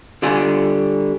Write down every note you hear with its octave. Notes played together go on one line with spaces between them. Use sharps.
D3 G3 F4 G#5